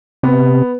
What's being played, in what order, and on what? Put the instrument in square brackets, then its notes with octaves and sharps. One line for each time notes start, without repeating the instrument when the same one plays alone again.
[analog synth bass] C3 [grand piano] B3